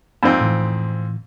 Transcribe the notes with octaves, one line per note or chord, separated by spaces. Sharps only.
F2 G#2 C4
A2 E3